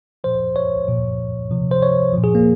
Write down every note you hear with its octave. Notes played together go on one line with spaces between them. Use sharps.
A#2 F3 C5
C#5
A#2 F3
C3 F3
C5
C#5
A#2 F3
G#4
A#3